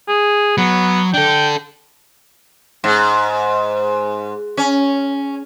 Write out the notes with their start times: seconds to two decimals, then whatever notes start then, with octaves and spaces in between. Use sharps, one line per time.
0.09 G#4
0.58 F#3 B3
1.14 D4 A4 G5
2.84 G#2
4.57 C#4